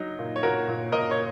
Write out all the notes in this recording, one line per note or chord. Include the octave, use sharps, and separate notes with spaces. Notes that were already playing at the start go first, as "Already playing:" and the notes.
Already playing: F#3 D#4
A#2
C#5
A#2 F#4 A#4
A#2
A#2 A#4 D#5
C#5